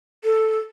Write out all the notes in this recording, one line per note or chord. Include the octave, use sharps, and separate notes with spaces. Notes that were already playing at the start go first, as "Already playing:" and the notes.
A4